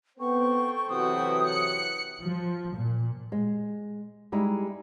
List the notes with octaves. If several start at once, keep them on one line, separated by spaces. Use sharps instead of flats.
B3 C4 A4 C5 G5 C#6
C3 E3 F#3 C4 F#4 B4 D#6
F#6 C#7
F3
A#2
G#3
G3 G#3 D#4 E4